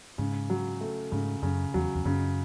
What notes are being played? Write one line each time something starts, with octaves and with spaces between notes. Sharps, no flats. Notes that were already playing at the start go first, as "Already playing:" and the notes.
G#2 C#3
F#3
A3
G#2 C#3
F#2 C#3
E2 F#3
E2
F#2 C#3